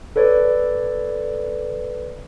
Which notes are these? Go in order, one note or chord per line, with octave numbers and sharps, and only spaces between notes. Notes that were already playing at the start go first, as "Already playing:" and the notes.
A4 B4 C#5 D5